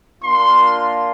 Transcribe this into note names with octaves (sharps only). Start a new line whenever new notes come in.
A#3 D4 F4 C6